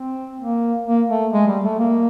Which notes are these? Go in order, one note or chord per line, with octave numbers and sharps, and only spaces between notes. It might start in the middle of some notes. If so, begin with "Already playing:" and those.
Already playing: C4
A#3
A#3
A3
G#3
G3
A3
A#3